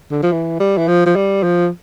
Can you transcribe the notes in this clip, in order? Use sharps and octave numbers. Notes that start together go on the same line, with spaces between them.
D3
F3
E3
G3
E3
F3
F3
G3
F3